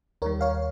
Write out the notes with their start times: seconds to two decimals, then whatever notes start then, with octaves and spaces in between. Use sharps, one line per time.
0.22 D#2 D#3 G3 A#4 C#5
0.41 C#5 F5